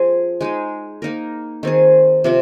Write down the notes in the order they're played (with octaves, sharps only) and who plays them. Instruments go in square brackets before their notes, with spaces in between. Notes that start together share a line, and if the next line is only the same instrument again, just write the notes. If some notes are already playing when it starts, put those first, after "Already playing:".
Already playing: [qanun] F3 C4 G#4
G#3 D#4 G#4
A#3 D#4 A#4
D#3 C4 G#4
C3 F3 C4